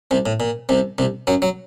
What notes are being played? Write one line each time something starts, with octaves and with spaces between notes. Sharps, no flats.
C2 C3
A2
A#2
C2 C3
C2 C3
F#2 F#3
F#3